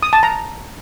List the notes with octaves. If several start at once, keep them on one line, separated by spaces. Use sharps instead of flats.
D#6
A5
A#5